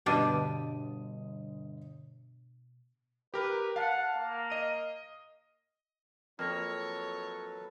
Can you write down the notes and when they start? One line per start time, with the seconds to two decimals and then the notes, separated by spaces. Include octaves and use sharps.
0.06 G1 B2 D4 G4 D#5 D#7
3.34 G4 A#4 B4
3.76 F5 F#5 A5
4.16 A#3
4.50 D#5 D#7
6.39 F2 F#3 A#3 A4 B4 C#5 F6 A#6